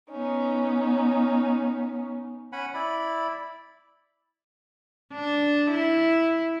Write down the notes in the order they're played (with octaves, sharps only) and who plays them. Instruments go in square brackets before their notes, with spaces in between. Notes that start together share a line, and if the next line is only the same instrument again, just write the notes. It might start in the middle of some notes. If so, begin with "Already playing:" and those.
[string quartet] B3 C#4 D#4
[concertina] C#4 F#5 G#5 B5
E4 D5 B5
[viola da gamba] D4
E4